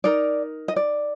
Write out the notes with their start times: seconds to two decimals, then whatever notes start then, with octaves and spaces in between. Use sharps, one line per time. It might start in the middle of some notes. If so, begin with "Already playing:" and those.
0.04 D#4 A#4 D5
0.68 D#5
0.76 D5